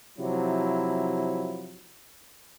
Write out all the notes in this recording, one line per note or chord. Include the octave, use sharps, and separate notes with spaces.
C3 F3 F#3 E4